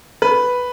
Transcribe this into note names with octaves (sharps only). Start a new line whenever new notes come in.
B4